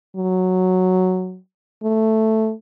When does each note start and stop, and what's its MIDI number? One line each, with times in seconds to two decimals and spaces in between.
0.16 1.38 54
1.84 2.53 57